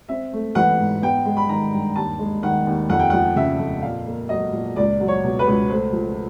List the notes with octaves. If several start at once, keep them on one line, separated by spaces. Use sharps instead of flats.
C4 E5
A3
E3 F#5
G#2
B3 G5
G#3
B5
D#3 A#5
G2
D#2 A5
G#3
D#3 F#5
D#2
F2 F#5
G5
F3 F#5
C#3 E5
F2
A#2 F5
A#3
F#3 D#5
A#2
C#2 D5
F#3
C#5
B2
B4
C#2
A3 C5
F3